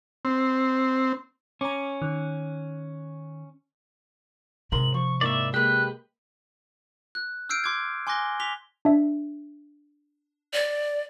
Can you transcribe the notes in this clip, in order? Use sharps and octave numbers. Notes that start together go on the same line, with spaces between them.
C4
C#4 A#5 D6
D#3
G#2 C3 A#4 C6 F#7
F3 C#6
G#2 A#3 E4 D5 E5
G#3 A#3 G4 B4 F#6
F#6
E6 F6 G6 C7 D7
C6 D6 G6 G#6
G#5 C6 D6 F#6 A#6 G7
D6 B6 F7 G7
D4 E5
D5